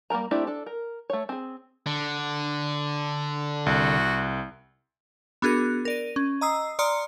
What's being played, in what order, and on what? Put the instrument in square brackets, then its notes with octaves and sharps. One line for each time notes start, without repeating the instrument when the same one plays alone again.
[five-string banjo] G3 A#3 C4 A#4 A#5
A3 C4 D4 E4 G4
D4 A4
A#4
A3 C#5
C4 G#4
[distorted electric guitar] D3
[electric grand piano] C2 [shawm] F#4
[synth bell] B3 D4 F#4 G#4 A#4 F#6
A#4 D5 D#7
C#4
D#5 A#5 D#6 E6 C7
D5 A#5 C6 D#6 F6 C#7